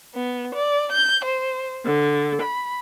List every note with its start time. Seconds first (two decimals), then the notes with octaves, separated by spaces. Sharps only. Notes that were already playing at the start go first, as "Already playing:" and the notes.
0.14 B3
0.54 D5
0.92 G6
1.24 C5
1.85 D3
2.41 B5